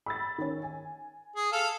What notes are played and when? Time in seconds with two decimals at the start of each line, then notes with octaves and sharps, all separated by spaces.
0.06 B5 E6 A6
0.38 D#3 C#4
0.63 G#5
1.36 G#4
1.52 A4 F5